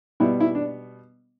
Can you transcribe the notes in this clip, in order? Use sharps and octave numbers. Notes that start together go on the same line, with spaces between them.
B2 G3 B3 E4
E4
D4